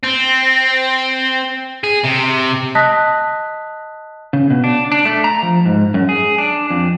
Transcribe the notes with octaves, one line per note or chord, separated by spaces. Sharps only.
C4
G#4
C3
D#5 A5 D#6 F#6 A#6 B6
C#3
B2
D4
D4
A3
A#5
F3
G#2
F#2
G#4
D4
F2